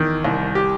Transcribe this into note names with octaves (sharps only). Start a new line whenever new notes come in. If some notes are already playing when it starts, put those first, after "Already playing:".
Already playing: E2 D#3
C2
G4